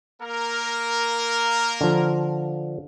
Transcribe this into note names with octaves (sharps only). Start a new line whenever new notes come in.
A#3 A#4
D3 F3